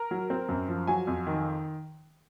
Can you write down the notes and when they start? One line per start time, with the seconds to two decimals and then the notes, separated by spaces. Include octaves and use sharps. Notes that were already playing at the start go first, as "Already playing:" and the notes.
Already playing: A#4
0.11 F#3
0.30 C4
0.49 F#2
0.68 F3
0.87 F#3 G#5
1.07 F2
1.27 D#3